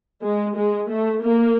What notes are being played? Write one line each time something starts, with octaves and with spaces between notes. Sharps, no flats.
G#3
G#3
A3
A#3